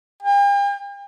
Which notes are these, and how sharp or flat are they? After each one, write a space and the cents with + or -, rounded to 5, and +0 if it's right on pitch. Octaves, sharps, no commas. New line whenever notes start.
G5 +45